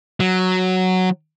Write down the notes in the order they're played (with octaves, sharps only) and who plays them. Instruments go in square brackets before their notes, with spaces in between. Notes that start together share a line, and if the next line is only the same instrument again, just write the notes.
[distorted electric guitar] F#3